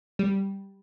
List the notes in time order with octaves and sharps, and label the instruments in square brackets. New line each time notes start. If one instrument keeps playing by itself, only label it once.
[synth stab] G3